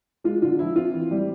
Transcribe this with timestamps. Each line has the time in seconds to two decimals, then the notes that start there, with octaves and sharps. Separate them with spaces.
0.24 G#3 F4
0.42 D3 F4
0.59 F3 E4
0.76 C4 F4
0.93 E3
1.11 G3